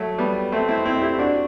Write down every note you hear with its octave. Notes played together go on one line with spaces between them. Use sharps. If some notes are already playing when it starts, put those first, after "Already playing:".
Already playing: F#3 A3
G3 B3
A3 C4
C4 E4
C4 E4
E4 G4
D4 F#4